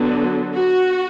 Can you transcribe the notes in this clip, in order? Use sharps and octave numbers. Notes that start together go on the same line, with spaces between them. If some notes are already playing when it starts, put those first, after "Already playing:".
Already playing: D3 F#3 B3
F#4